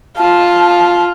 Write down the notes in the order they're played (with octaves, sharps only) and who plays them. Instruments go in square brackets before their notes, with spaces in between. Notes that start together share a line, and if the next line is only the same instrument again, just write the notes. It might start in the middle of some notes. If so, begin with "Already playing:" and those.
[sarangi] F4 [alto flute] A5